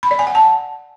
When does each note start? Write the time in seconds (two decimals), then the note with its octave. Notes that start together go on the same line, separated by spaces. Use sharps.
0.03 B5
0.11 D5
0.19 G#5
0.27 F#5
0.35 A5